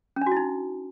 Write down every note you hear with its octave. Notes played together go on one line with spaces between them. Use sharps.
C#4
D4
F#4
E4
D#4